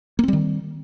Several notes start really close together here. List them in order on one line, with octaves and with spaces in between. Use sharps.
A#3 C4 G3 D#3